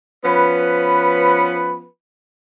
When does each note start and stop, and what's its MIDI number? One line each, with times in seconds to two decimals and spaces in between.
0.25 1.85 53
0.25 1.85 59
0.25 1.85 61
0.25 1.85 71